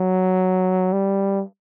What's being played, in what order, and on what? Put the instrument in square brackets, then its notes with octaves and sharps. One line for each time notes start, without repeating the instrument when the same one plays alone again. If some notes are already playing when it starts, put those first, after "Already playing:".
Already playing: [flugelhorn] F#3
G3